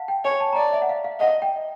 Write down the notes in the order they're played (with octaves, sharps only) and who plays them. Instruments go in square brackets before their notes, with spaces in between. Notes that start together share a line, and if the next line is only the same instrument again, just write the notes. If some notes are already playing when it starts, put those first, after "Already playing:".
Already playing: [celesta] F5 F#5 A5
G5
[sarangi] C#5 [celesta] G#5
[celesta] A5
A#5
[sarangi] D5 [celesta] A5
[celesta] E5
F#5
F5
F5
[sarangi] D#5 [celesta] F#5
[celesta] G5